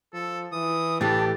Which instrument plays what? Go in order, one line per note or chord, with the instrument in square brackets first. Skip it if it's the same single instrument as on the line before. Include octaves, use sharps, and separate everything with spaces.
[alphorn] F3 [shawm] A4
[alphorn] E3 [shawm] D#6
[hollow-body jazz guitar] A2 E3 [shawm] D4 [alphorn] G4 [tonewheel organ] A5